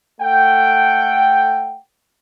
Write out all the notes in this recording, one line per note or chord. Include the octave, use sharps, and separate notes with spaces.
A3 A4 F#5 G5